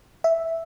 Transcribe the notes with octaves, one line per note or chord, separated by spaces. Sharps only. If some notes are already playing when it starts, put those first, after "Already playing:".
E5